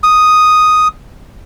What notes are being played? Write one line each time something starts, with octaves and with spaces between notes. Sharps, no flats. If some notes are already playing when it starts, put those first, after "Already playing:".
D#6